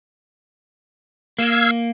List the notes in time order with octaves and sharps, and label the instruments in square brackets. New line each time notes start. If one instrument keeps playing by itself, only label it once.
[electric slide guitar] A#3 [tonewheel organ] F5 E6 G#6